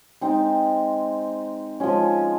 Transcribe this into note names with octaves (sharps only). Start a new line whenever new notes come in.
G#3 C4 D#4
F3 G#3 C#4